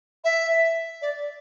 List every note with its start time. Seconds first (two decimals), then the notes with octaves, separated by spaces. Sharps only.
0.24 E5
1.02 D5